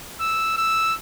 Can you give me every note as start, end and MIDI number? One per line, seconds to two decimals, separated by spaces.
0.21 0.53 88
0.58 0.95 88